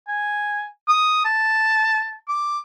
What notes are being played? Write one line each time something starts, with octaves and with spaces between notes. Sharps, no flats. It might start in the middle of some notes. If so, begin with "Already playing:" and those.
G#5
D#6
A5
D6